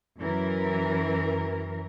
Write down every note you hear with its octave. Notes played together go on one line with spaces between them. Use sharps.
F#2 E3 A#4